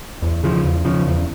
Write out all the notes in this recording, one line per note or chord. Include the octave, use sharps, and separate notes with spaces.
E2
C#3 F3
E2
C#3 F3
E2